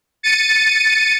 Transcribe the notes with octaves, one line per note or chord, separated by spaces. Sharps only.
A6 C#7 D#7